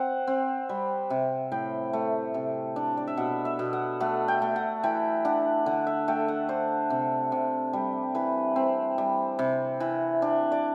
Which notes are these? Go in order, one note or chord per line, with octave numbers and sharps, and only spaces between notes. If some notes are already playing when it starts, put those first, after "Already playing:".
Already playing: C4 F#5
C4
G3
C3
A2 G5
A3
C3
D4
D5
E5
B2 F#5
E5
B2
F#5
A3 F#5
G5
A3
F#5
E3 G5
D4 F#5
D3 F#5
E5
A3 G5
F#5
D4 C5
C3
C3
G3
E3 B4
C4
G3
C3
E3
D4
D5